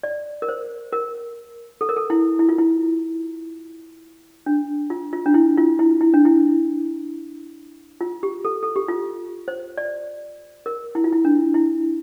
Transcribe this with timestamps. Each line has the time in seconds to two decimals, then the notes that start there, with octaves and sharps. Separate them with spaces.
0.03 D5
0.42 A#4
0.49 C5
0.93 A#4
1.81 A4
1.89 A#4
1.97 A4
2.10 E4
2.39 E4
2.49 F4
2.58 E4
4.46 D4
4.90 F4
5.13 F4
5.26 D4
5.34 E4
5.57 F4
5.79 E4
6.01 E4
6.14 D4
6.25 E4
8.01 F4
8.23 G4
8.45 A4
8.63 A4
8.76 G4
8.88 F4
9.48 C5
9.77 D5
10.66 A#4
10.95 E4
11.04 F4
11.12 E4
11.25 D4
11.54 E4